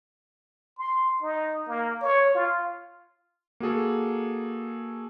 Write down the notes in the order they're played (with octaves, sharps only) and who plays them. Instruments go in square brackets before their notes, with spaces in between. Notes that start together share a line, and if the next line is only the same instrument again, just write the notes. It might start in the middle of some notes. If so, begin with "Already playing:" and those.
[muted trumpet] C6
D#4
A#3
C#5
F4
[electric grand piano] A#3 F#4 G#4 A4